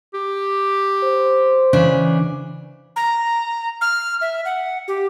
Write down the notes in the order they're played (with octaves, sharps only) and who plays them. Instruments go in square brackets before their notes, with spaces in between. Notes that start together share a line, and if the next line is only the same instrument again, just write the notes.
[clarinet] G4
[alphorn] C5
[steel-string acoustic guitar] C#3 E3 D4
[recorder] A#5
F6
E5
F#5
G4